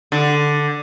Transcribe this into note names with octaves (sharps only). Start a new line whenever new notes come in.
D3